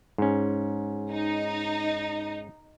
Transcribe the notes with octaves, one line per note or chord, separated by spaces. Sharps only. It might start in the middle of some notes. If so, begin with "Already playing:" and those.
G#2 C#4
D#4